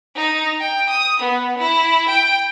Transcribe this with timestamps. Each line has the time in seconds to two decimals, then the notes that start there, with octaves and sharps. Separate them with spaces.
0.16 D#4
0.60 G5
0.90 D#6
1.20 B3
1.58 E4
2.09 G5